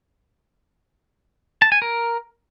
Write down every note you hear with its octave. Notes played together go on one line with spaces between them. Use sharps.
A5
G#5
A#4